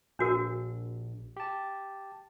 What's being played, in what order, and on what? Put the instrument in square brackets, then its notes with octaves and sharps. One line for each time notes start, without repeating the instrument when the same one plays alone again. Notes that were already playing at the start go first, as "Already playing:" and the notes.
[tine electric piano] A#1 [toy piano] D4 F#4 A#4
[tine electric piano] G4 A5